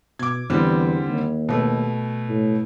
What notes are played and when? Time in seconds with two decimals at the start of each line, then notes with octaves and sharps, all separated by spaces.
0.19 B2 D6 G#6
0.50 E2 D3 G3 C4
1.07 D#2
1.49 B2 A3
2.29 A2